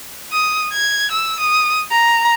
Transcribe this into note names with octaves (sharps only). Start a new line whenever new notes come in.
D#6
G#6
E6
D#6
A#5